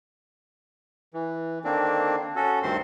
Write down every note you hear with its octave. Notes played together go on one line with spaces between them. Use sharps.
E3
D3 D#3 A#3 C4 D4
C#4 F#4 A4
D2 G2 D#3 C4 C5 C6